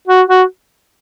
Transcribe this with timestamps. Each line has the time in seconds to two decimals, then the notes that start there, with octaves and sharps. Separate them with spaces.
0.07 F#4
0.28 F#4